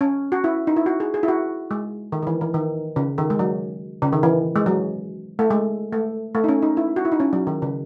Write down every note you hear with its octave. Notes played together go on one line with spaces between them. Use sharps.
C#4
F#4
E4
D#4
E4
F#4
G#4
G#4
E4
F#4
G#3
D#3
D#3
E3
E3
D#3
C#3
D#3
G#3
F#3
C#3
D#3
E3
G#3
F#3
A3
G#3
A3
A3
D#4
C#4
D#4
E4
F#4
E4
D#4
C#4
F#3
D#3
C#3